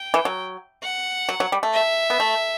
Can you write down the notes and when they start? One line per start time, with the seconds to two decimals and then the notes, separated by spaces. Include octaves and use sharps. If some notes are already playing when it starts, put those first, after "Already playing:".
Already playing: G5
0.14 E3
0.25 F#3
0.83 F#5
1.29 F#3
1.40 F#3
1.52 G3
1.63 A3
1.74 E5
2.10 B3
2.20 A3